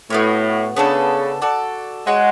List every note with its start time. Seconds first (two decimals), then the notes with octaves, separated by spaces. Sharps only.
0.10 A2 B3 F#4 C#5
0.76 C#3 B3 D4 A4
1.42 F#4 A4 D5
2.07 G#3 F#4 C#5 F#5